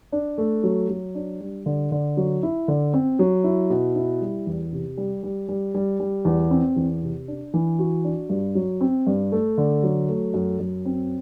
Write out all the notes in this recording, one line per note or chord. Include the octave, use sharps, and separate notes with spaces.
D4
A3
F#3
F#3
D4
G3
D3
D3
F#3
E4
D3
C4
F#3
E4
B2
E4
G3
E2
C3
G3
G3
G3
G3
G3
E2
C4
E2
C3
D4
E3
F#4
D4
G2
F#3
C4
G2
A3
D3
F#3
A3
F#2
F#2
C4